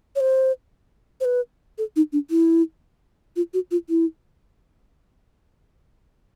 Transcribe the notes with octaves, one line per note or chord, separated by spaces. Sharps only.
C#5
C5
C5
B4
A4
D#4
D4
E4
F4
F#4
F4
E4